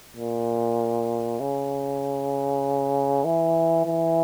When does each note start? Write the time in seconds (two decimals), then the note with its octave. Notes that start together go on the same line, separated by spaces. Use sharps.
0.16 A#2
1.40 C#3
3.25 E3
3.86 E3